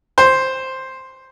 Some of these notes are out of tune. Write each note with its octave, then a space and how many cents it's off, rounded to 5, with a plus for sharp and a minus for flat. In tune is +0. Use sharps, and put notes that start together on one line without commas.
C5 +5